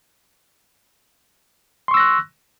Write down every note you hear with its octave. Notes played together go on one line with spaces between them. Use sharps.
C6 C#6 E6 F#6 A#6